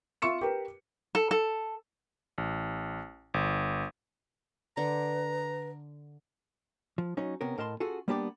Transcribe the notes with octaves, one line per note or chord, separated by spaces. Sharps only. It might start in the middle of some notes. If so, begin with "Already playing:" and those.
F4 E5 C#6 C#7 E7
G4 A#4 B4
A4
A4
A1
G1
D3 B4 A#5
F3
F#3 C#4 D#4
C3 B3 C#4 A#4
A2 A#4 D#5 A5 C6
C#4 F4 F#4 G#4 A4
G3 A#3 B3 D4 G4 D5